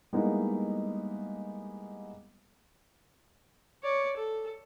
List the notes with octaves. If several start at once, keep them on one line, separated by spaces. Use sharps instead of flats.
G3 G#3 A#3 B3 D#4 E4
C#5 D5
A4